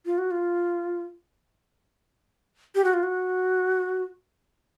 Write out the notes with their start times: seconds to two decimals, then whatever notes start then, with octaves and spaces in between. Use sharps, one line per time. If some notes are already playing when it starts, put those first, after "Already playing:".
0.06 F4
0.18 F#4
0.31 F4
2.75 G4
2.84 F#4
2.94 F4
3.03 F#4